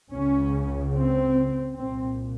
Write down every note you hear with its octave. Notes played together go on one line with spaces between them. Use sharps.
C#2 C#3 C#4
C4
C2 A#2 C4